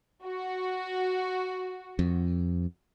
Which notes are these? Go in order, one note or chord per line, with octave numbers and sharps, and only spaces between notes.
F#4
F2